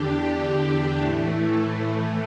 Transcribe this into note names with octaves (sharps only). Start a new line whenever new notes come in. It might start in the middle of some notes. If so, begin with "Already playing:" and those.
Already playing: E2 D3 D4 G4
A2 E3 A3